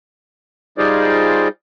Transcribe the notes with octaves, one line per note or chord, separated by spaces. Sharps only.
G3 D#4 F4 G#4 C5 D5